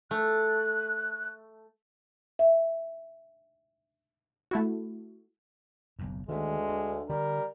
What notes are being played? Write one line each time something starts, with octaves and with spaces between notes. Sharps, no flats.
A3 F#6
E5
A3 E4 F#4
F#1 B1 F#2
D2 D#3 G#3 A3
D4
D3 G3 A#4